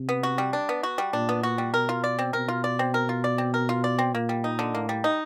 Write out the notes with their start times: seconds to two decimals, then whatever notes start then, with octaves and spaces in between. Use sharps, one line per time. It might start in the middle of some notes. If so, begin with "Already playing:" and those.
Already playing: C3
0.09 B3
0.23 F#4
0.38 G3
0.53 D4
0.69 B3
0.83 F#4
0.98 G3
1.13 A#2 D4
1.29 B3
1.43 F#4
1.58 G3
1.74 B2 A#4
1.89 F4
2.04 D5
2.19 C4
2.33 B2 A#4
2.48 F4
2.64 D5
2.79 C4
2.94 A#4
3.09 F4
3.24 D5
3.38 C4
3.54 A#4
3.69 F4
3.84 D5
3.99 C4
4.14 A#2 A#3
4.29 G3
4.44 D#4
4.59 D3
4.74 A2 A#3
4.89 G3
5.04 D#4